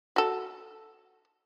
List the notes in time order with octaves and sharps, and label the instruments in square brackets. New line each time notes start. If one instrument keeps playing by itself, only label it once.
[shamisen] F#4 A4